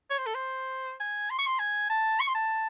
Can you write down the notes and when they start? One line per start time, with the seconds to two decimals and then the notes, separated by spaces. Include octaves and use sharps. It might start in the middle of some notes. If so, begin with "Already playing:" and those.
0.10 C#5
0.18 C5
0.26 A4
0.35 C5
1.00 G#5
1.30 C6
1.39 C#6
1.46 C6
1.59 G#5
1.90 A5
2.20 C#6
2.27 C6
2.35 A5